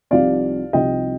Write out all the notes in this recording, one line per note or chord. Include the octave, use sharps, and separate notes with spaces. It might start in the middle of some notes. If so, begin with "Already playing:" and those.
C2 C3 F3 C4 D#4 D5 F5
C2 C3 F3 C4 D#4 D#5 G5